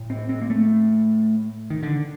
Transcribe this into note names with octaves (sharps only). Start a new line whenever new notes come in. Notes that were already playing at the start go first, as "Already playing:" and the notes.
Already playing: A2
C4
C4
A#3
A3
D#3
D3